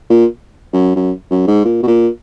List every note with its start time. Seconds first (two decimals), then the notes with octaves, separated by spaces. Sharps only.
0.10 A#2
0.73 F#2
0.96 F#2
1.30 F#2
1.47 G#2
1.65 A#2
1.83 B2
1.87 A#2